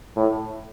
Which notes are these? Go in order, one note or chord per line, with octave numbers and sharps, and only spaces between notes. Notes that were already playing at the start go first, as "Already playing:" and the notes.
A2